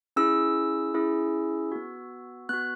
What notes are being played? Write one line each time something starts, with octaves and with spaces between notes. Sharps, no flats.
C#4 E4 G#4 E6
C#4 E4 G#4
B3 F#4
B3 F#4 F#6